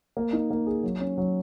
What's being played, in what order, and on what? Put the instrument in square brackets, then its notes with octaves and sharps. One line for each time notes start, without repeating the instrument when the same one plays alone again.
[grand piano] A#3
D#4
A#3
G#4
F#3
C#4
F#3